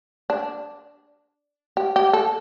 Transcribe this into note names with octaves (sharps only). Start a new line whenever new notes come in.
D4
G4
G4
A4